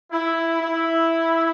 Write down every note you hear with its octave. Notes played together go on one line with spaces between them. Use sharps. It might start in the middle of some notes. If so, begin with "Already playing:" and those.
E4
E4